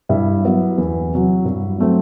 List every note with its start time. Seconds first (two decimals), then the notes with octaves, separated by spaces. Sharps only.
0.09 G2 E4 E5
0.44 F#3 B3
0.78 E2
1.12 C3 F#3
1.45 G2
1.78 F#3 A3 C4